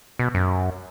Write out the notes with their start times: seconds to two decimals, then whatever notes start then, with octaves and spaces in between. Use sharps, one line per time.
0.19 B2
0.35 F#2